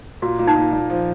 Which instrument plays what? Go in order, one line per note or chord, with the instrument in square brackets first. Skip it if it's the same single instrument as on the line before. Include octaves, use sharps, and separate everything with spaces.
[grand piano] A#2 [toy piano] F#4
[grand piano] A#2
[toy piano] D#4
[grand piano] A#2
A#2
F3